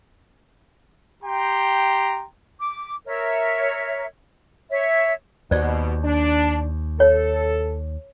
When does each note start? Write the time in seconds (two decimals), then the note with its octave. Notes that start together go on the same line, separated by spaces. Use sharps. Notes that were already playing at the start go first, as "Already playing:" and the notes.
1.23 G4 G5 A#5 C6
2.59 D6
3.06 A#4 C#5 E5
4.70 C#5 E5
5.51 D#2 B2 C5 D5
6.03 D4
7.00 A4 C#5